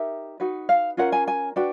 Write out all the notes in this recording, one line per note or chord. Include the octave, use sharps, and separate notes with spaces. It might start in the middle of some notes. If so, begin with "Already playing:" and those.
Already playing: D#4 G4 A#4 E5
D#4 F#4 B4
F5
C#4 F4 A#4 F#5
G#5
G#5
D4 F#4 B4 G5